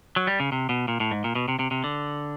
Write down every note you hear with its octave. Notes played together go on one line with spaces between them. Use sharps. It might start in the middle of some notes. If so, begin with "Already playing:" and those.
F#3
G3
C#3
C3
B2
A#2
A2
G#2
A#2
B2
C3
C3
C3
D3